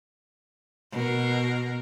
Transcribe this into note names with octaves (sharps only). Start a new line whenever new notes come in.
B2 A#4